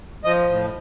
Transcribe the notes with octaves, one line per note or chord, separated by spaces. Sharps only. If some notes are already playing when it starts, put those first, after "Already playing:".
F3 D#5
A2